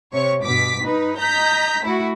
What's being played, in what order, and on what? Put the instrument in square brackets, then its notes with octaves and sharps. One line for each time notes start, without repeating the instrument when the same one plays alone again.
[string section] C3 C#5 C#6
G2 B2 D6 B6
D#4 B4
D#5 A#5 G6 B6
A3 E4 F#4